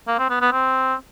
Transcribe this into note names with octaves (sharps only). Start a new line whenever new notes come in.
A#3
C4
B3
B3
C4